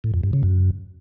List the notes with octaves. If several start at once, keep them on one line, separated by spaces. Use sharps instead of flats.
A2
F2
G2
C#3
F#2